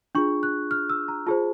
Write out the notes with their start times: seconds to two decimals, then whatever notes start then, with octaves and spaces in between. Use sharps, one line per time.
0.15 D4 F4 G#4 C#6
0.43 F#6
0.71 F6
0.90 E6
1.08 A#5
1.26 F4 G#4 C5 A5